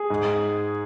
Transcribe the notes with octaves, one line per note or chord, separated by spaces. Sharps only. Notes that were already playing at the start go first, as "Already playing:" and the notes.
Already playing: G#4
G#2